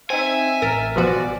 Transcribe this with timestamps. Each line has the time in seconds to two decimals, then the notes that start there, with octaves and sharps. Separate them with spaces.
0.10 C4 D#4 E5 G#5
0.62 A1 A#4 E5 A6
0.96 B2 F3 F#4 D5